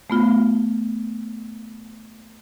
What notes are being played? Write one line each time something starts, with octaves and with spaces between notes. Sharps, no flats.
A3 B3 F4